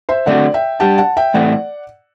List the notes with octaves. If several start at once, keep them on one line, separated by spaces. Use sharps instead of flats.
C5 E5
D3 A3 C4 F#4 D5 F#5
E5 G5
G3 D4 G4 F#5 A5
F#5 A5
E5 G5
A2 E3 A3 C4 D5 F#5